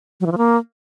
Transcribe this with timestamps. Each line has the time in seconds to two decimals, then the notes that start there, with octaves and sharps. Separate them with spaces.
0.20 F#3
0.26 E3
0.32 F3
0.38 A#3